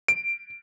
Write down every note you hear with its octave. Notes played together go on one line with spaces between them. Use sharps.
D7